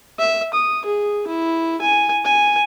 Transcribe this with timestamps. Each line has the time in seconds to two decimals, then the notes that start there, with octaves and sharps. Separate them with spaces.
0.19 E5
0.54 D#6
0.85 G#4
1.27 E4
1.81 G#5
2.25 G#5